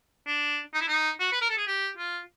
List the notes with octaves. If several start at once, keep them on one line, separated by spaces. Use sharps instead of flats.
D4
D#4
E4
D#4
F#4
B4
A#4
A4
G#4
G4
F4